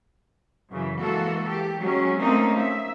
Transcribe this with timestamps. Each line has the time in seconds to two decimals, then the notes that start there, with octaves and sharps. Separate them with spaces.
0.70 F#2 C#3 E3
1.01 E3 G#3 A#3 F#4 A4
1.48 G4
1.80 F#3 G#3 C#4
2.20 A3 A#3 C4 C#4 D#4
2.59 E5